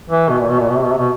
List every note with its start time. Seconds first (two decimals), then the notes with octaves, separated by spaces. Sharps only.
0.10 E3
0.29 B2
0.40 A#2
0.49 B2
0.59 A#2
0.69 B2
0.76 C3
0.83 B2
0.91 C3
0.98 B2